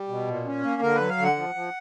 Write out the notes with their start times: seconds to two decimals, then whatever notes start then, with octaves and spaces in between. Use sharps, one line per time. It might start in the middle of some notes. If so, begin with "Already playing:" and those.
Already playing: G3
0.08 B2
0.27 A#2
0.45 C#4
0.63 A#3
0.82 D3 A#4
0.95 B4
1.00 F#3
1.09 F5
1.18 D3 F#5
1.36 F3
1.55 F3